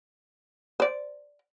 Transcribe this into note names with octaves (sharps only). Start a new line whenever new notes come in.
C5 D5